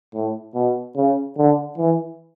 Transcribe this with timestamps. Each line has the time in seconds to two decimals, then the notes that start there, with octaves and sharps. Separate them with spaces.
0.14 A2
0.55 B2
0.96 C#3
1.38 D3
1.78 E3